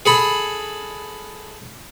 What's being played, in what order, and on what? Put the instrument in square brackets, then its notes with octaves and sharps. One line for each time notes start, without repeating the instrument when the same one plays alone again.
[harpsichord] G#4 A4 B5